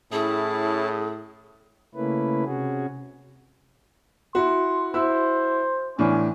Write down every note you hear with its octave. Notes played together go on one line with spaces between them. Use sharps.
A2 C#4 E4 G#4 A5
C#3 A3 A#3 C#4 E4 B4
C3 C#4 F#4 G#4
E4 F#4 C6
E4 F#4 C5 E6
A2 E3 C#4 D4